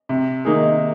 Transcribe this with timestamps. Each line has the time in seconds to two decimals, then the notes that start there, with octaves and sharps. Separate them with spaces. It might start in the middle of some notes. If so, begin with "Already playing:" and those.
0.09 C3
0.45 D#3 A#3 D#4 G#4